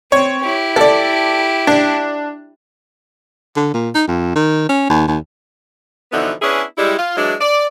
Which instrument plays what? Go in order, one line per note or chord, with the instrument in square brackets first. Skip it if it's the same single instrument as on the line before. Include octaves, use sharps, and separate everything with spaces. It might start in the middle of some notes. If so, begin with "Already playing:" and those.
[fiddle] C4 [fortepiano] C#5
[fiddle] E4 G4
[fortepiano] A4 D5
D4
[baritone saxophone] D3
A#2
D#4
F2
D#3
C#4
D#2
D#2
[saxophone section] B2 D3 E3 F3 B3 D#4
B3 C#4 D4 E4 G#4
G3 G#3 E4
F4
E3 F#3 G#3 D4
D5